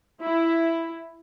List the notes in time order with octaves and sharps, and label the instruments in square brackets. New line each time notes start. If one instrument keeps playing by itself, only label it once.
[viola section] E4